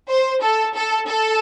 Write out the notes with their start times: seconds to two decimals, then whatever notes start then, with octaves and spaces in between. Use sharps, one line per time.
0.10 C5
0.44 A4
0.77 A4
1.10 A4